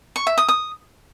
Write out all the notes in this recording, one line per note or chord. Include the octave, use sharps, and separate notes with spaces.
C#6
E5
D#6
D#6